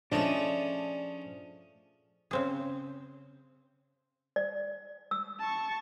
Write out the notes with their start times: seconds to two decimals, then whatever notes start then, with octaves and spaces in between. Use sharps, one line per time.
0.12 F3 A3 C#4 D4 G#4 D#5
2.31 C#3 C4 G#4
4.36 D5
5.11 E6
5.40 A5 C#6